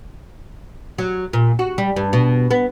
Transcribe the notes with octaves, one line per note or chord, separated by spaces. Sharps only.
F#3
A#2
F#4
G3
G2
B2
B3